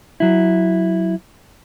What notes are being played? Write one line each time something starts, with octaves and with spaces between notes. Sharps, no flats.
F#3 E4